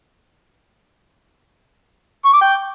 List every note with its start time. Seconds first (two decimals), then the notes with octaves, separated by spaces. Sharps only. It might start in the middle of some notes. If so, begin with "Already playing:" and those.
2.25 C#6
2.33 D6
2.41 G5